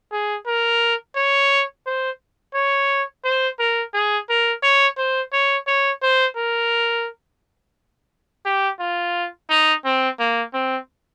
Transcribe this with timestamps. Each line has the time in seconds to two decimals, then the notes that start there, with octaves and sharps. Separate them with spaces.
0.13 G#4
0.47 A#4
1.16 C#5
1.86 C5
2.55 C#5
3.24 C5
3.59 A#4
3.94 G#4
4.29 A#4
4.63 C#5
4.98 C5
5.33 C#5
5.67 C#5
6.02 C5
6.37 A#4
8.46 G4
8.80 F4
9.50 D#4
9.85 C4
10.19 A#3
10.54 C4